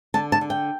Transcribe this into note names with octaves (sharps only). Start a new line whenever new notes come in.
D3 A5
A5
D3
G5